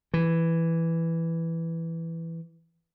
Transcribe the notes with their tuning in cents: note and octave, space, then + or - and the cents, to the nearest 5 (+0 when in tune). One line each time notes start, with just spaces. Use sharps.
E3 +5